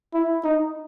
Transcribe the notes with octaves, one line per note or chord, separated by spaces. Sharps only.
E4
D#4